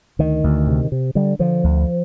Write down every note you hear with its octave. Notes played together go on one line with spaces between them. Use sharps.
D2 D#3
D2
C3
C3
D3 G3
D3 F3
D2